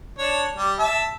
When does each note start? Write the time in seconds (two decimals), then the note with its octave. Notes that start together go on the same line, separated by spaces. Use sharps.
0.18 D4 C#5
0.56 G3
0.79 E5 A5